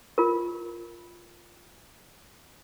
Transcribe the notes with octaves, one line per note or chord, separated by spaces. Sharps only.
F4 A#4